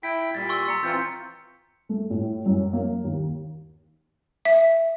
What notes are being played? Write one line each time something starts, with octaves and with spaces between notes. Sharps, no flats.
E4 G5 B6
A#2 G3 A6 B6
C6 C#6 E6
A#5 C#7
E3 C4 F4 G6 C#7
A3
A2
F#2
A#3
D#2
E5